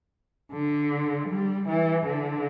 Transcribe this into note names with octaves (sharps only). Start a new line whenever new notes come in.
D3
G3
E3
D3